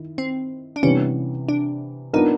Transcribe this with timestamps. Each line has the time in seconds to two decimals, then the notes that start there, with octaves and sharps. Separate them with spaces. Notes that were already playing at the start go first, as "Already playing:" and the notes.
Already playing: D#3 E4
0.18 C4
0.76 D4
0.83 C3 E3 G3 B3 C#4
1.49 D4
2.13 B3 D4 D#4 F4 A#4